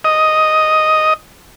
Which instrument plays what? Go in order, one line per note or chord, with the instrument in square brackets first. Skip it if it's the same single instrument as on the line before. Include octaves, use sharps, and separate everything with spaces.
[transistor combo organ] D#5